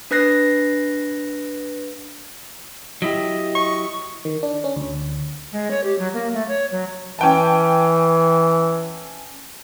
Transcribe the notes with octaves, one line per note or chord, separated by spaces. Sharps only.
D4 B4 F#6 A#6 C7
F#3 E4 G4 D#5
C#6
D#3
D4
C#4
D2
G#3
C#5
G4
F#3
A#3
A3
C#5
F#3
E3 C#4 G5 A5